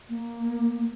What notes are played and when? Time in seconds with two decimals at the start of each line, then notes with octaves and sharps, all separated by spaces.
0.09 A#3